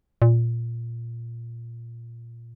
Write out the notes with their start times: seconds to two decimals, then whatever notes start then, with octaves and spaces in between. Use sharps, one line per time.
0.22 A#2